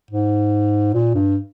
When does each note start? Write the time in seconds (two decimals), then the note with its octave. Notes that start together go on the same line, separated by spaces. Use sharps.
0.11 G#2
0.94 A#2
1.14 G2